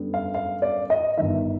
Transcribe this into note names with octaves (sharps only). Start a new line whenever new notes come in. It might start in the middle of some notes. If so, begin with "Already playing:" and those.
Already playing: F#2 D3 G3 B3
F5
F5
D5
D#5
G1 G2 D#3 E5